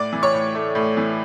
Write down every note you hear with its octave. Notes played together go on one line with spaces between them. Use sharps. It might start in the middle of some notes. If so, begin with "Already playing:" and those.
Already playing: A2 D5 D6
E3
C#5 C#6
A2
A3
A2
E3